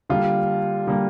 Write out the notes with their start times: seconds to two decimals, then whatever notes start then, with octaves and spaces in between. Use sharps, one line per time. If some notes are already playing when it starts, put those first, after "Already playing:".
0.09 D3 G3 A#3 F4
0.87 D3 G3 A#3